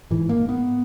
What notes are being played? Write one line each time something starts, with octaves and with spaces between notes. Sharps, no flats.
G#2 E3
A#3
G#2
B3